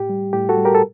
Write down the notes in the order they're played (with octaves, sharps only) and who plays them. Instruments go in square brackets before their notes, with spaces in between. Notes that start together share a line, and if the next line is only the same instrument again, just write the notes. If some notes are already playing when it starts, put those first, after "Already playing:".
Already playing: [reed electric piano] A2 G4
G3
A2 G4
F#4 A4
G3
G4 A#4
A4